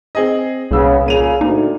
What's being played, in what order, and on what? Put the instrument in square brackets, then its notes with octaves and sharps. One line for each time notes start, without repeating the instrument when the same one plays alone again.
[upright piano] C4 G#4 D#5
[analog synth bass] C2 [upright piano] A#2 E6 [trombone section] C#3 B3
[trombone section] A#2 C#3 [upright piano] A#3 D#7 F7
[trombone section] D2 [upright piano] A#2 [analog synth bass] D#4